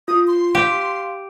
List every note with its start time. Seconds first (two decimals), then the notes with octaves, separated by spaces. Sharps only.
0.08 F4 D#6
0.27 C6
0.55 G4 F5